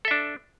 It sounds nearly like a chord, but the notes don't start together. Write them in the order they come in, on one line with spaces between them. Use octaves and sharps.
A4 E5 D4